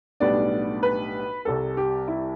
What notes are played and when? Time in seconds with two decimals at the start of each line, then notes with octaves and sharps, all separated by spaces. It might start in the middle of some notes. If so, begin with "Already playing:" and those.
0.20 B1 A2 G3 B3 D4 D5
0.83 B4
1.45 C2 C3 G3 A4
1.77 G4
2.08 E4